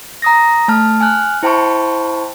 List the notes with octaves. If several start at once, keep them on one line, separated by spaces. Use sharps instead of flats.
A#5 D#6 A#6
A3 A5 F6
G#5 F6 F#6
E4 C5 G5 A5 B5 C#6